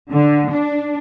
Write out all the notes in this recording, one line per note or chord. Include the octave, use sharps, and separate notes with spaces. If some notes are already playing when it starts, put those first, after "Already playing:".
D3
D4